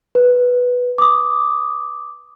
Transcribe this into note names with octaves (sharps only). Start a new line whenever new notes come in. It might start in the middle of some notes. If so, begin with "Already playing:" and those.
B4
D6 D#6